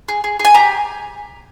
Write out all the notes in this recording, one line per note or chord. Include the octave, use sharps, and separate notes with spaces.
G#4
G#4
G#4
G#5
G4 A#5